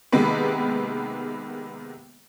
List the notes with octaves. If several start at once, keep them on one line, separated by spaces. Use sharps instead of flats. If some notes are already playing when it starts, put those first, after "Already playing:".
C3 D#3 G#3 A#3 B3 B4